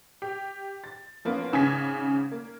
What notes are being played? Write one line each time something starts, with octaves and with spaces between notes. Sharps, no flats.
G4
A6
F3 A#3 B3 C#4 F4
G#1 C#3 G#5 G#6 B6
A#3